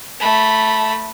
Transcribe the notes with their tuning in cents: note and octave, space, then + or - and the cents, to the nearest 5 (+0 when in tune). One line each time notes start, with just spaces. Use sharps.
A3 +0 B5 -10